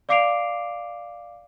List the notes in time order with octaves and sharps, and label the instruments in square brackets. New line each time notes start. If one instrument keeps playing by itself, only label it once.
[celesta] D5 F5 D6 C7 D7 F7